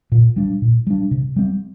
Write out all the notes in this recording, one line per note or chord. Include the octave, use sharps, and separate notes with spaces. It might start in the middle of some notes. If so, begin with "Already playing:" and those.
A#2
G3 D4
A#2
G3 D4
C3
G3 C4